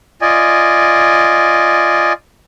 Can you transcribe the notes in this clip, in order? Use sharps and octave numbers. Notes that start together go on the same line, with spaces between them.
F4 D5 D#5 G#5